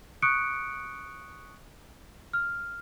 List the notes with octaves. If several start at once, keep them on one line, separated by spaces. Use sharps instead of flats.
C#6 D#6 F#6 C#7 D7
F6